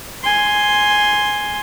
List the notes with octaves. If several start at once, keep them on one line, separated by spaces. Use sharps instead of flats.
G#5 C6